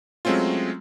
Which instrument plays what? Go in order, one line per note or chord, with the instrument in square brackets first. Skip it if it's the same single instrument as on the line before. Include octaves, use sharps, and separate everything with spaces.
[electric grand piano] F#3 G#3 A3 C4 C#4 F4